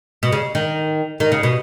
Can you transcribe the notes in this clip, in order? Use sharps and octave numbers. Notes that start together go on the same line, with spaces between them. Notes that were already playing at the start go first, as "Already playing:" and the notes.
B2
C#3
D#3
D#3
C#3
B2